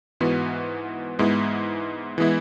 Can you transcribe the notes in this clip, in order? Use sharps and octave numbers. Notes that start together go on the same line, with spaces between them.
G#2 E3 B3 F#4 B4
G#2 G#3 B3 E4
E3 G#3 B3 E4